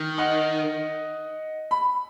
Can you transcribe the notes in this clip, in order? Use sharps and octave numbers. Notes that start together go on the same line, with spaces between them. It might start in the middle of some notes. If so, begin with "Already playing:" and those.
Already playing: D#3
D#5 F#5
B5